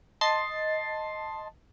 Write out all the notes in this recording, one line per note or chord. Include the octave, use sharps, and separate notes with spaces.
D#5 A5 C6 A6 C7